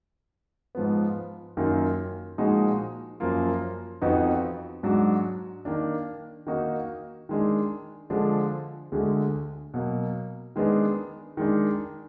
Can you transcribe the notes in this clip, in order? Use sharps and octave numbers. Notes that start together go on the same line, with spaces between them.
G#2 F3 B3
F#2 D#3 A#3 F4
A#2 F3 G#3 D#4 F#4
F#2 F3 A#3 F4
F2 F3 B3 D#4 F#4
G#2 F#3 D4 F#4
D#3 A#3 D4
D#3 A#3 D#4 F#4
D#3 G#3 D4
D3 F3 G#3 D4
D2 D3 G#3
B2 F#3 A#3
D#3 G#3 B3 D4
D#3 G#3 D4